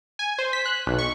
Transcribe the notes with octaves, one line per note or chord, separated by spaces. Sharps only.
G#5
C5
B6
F#6
B1
C#6